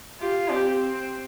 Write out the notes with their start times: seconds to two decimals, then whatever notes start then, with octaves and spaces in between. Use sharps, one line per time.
0.21 F4 G4
0.51 C4 G4
0.79 C4